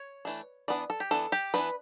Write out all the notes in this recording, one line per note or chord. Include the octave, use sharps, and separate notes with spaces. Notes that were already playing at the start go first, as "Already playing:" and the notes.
Already playing: C#5
E3 A3 D4
E3 B3 D4 D5
A4
G4
E3 B3 D4 A4
G4
E3 B3 D4 B4